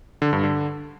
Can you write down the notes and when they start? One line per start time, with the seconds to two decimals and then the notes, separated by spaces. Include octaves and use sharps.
0.22 D3
0.33 G2
0.44 D3